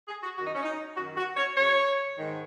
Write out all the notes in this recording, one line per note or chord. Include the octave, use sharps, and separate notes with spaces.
G#4
F#4
F#2 D#3 F#4
D#4
C#4
D#4
F#2 D#3 F#4
F#4
C#5
F#2 C#3 C#5
G#2 D#3